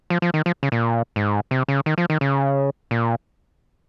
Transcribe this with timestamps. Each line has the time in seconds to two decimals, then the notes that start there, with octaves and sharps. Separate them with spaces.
0.10 F3
0.22 F3
0.34 D#3
0.46 F3
0.63 C#3
0.72 A#2
1.16 G#2
1.51 C3
1.68 C#3
1.86 D#3
1.98 F3
2.10 D#3
2.21 C#3
2.91 A#2